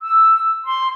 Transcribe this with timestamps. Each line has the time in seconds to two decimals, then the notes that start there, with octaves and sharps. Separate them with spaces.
0.03 E6
0.65 C6